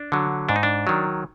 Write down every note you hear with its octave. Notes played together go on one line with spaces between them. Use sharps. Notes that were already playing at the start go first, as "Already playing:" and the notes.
Already playing: D4
D3 F#3
G#2 D4
D#4
D4
D#3 F#3